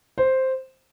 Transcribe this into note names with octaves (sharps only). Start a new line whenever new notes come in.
C5